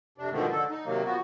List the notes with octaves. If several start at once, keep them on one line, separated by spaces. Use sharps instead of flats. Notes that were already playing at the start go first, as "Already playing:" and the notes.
F2 C3 D4
G#2 B2 D3 D#3 F3 A3
D3 A4
D#4
C3 D#3 F#3 A#3
F3 B3 F#4